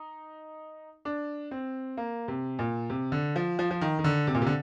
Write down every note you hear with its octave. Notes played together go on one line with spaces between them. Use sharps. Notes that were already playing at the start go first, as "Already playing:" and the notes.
Already playing: D#4
D4
C4
A#3
C3
A#2
C3
D3
F3
F3
F3
D#3
D#3
D3
C3
A#2
C3
D3